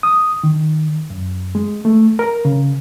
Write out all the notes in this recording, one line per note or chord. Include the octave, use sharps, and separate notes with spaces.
D#6
D#3
F#2
G#3
A3
A#4
C#3